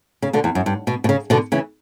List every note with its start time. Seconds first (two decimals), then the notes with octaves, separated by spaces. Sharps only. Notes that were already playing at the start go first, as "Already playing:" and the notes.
0.22 C#3
0.33 B2 D3
0.44 E2
0.55 F#2
0.66 G2
0.87 B2
1.04 B2
1.09 C#3
1.30 B2 D3
1.52 C#3 E3